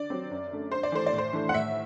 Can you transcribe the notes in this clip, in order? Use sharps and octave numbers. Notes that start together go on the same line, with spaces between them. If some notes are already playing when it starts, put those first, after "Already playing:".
Already playing: D3 D5
F#3 C4
F#2
D3 A3
G2 C5
D5
E3 A3 C5
D5
A2
C5
E3 A3 D4
F#5
A2 E5